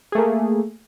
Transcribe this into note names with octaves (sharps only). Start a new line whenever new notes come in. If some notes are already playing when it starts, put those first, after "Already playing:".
A3 A#3 G#4